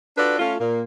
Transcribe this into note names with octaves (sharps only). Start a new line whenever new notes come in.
D4 F4 F#4 A4 B4 D5
A3 C#4 F4
A#2 A#3